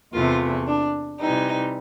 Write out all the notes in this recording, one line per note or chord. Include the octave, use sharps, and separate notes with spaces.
E2 C3 E3 A3 F4
D4
C3 E3 G3 D#4